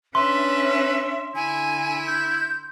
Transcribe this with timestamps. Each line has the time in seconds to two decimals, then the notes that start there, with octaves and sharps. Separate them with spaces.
0.15 C#4 D4 B4 E5 C6
1.35 D3 E4 G#5
2.07 G6